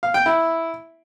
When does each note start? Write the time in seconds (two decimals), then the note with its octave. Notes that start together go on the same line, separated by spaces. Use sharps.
0.03 F5
0.14 G5
0.26 E4